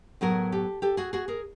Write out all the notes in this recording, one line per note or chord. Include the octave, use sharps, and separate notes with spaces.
A2 F#3 B3 G#4 A#4
G4 A4
G4 A4
F#4 G#4
F#4 G#4
G#4 A#4